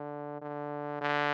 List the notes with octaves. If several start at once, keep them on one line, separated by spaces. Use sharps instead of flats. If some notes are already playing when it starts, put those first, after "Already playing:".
Already playing: D3
D3
D3